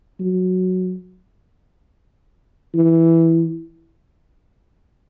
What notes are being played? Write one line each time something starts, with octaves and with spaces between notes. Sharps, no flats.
F#3
E3